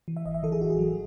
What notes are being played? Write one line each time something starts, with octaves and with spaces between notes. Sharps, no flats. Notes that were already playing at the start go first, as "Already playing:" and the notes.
E3
E5
G#1 D#5
E5
E3 A4
G#4
A1 F#4
G#4
F#3